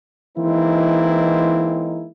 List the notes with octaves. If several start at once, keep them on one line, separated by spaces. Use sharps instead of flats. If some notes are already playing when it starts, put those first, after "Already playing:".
E3 G#3 A#3 C4 D#4 E4